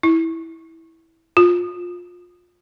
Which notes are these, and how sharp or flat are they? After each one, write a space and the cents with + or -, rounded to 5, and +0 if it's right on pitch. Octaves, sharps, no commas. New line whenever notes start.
E4 -10
F4 +25